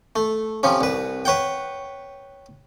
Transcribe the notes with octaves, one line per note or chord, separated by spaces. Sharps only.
A3
C3 F3 C#4
C2 B4
B4 C#5 F#5 G5